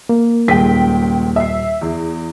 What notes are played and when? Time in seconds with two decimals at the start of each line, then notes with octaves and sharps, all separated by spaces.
0.09 A#3
0.48 D#1 C#2 G5 B6
1.36 E5 C7
1.81 E2